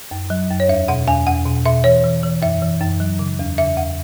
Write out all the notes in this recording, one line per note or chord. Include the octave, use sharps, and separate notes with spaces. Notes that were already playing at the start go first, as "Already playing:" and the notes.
F#2
F#3
F#2
C#5
E2 E5
B2 F#5
E2 G#5
E2 F#5
B2
B2 E5
E3 C#5
E3
E3
F#2 E5
E3
F#2
F#3
C#3
E2
C#3 E5
E2 F#5